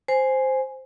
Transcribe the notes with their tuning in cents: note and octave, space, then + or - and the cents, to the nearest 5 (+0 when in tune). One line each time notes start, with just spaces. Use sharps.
C5 +0 G#5 +0